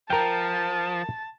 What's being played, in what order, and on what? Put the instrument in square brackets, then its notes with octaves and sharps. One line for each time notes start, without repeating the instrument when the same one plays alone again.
[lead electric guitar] F3 [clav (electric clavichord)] A#4 G5 [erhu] A5